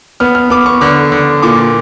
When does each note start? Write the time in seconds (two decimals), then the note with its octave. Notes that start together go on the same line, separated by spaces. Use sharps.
0.20 B3 F6
0.35 F6
0.50 B3 D6
0.66 C#6
0.81 D3 D6
1.12 D3
1.43 A#2 D6